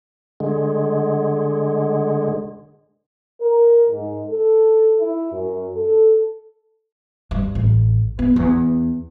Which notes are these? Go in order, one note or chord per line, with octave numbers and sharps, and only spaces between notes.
D3 G#3
A#4
G#2
A4
E4
F#2
A4
G2
A1
B3
E2